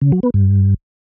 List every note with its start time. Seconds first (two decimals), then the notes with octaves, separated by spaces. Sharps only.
0.01 C#3
0.12 F#3
0.23 B3
0.34 G2